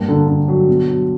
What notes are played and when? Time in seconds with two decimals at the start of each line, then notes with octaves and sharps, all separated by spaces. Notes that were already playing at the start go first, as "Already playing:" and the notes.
Already playing: G2 A#3
0.08 D3
0.28 D3
0.48 F#3
0.68 B2
0.88 F#3